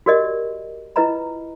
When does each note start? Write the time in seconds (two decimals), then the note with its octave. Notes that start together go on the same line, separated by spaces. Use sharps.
0.06 F#4 G4 A#4 D5 D#5
0.96 E4 F4 B4 D#5 A#5 B5